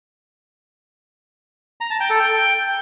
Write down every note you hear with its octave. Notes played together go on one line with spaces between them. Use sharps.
A#5
A5
G5
A4
G5